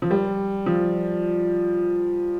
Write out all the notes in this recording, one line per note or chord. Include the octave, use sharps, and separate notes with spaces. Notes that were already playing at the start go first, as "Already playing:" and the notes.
F3
G3
F3